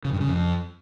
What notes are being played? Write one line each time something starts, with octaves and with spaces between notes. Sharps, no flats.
C#3
G2
C#3
F2